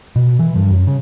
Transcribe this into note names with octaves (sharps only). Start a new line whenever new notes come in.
B2
E3
G2
F#2
C#3